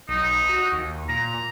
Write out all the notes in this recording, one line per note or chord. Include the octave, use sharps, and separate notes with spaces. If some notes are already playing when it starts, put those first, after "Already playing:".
B1 D#4
F#4
D#2
A#2 A#5